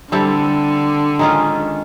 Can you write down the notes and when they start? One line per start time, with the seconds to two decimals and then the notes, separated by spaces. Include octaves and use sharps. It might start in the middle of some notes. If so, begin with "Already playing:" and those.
0.12 D3 G3 C4 E4 A4
1.19 D#3 G#3 C#4 F4